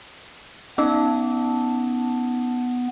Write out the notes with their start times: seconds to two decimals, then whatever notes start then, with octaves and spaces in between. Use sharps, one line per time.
0.78 B3 C#4 D#4 A5